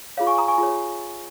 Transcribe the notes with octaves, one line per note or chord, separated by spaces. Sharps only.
F4 G#4 C#5 F5
G#5 C#6
A#5 D#6
G#5 C#6
F4 G#4 C#5